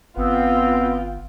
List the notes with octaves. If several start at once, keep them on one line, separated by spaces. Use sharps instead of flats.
G1 B3 C4 F4 G5